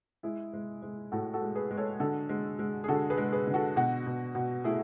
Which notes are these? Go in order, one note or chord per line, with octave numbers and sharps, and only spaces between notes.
G#3 E4 G#4
G#3
G#3
A2 F#4 A4
F#4 A4
G#3
G#4 B4
G#3
A4 C#5
D3 F#4 A4
G#3
G#3
G#4
D3 F#4 A4
G#4 B4
G#3
G#4 B4
D3
F#4 A4
B2 F#4
B2
B2
A3 E4 G#4